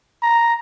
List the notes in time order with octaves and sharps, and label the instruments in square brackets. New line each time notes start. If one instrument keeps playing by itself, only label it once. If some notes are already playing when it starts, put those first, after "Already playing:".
[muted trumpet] A#5